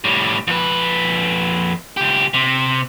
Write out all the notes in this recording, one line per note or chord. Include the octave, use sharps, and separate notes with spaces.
A2 G3
F2 B4
C#2 G4
C3